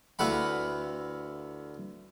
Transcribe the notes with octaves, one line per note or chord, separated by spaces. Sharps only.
D2 E4 B4 F5 F#5 B5